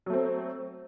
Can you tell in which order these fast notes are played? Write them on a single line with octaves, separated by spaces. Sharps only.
F#3 A3 C4